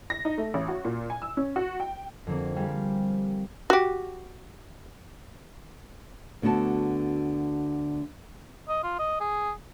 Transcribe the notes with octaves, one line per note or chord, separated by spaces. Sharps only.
A#6
D#4
A3
A1
F#4
A#2
G#5
E6
C#4
F#4
G5
F2 D3 A#3 C4
G3 C4 G4 G#4 F5
F#4 G4
D2 D3 B3 F#4 A5
D#5
F4
D#5
G#4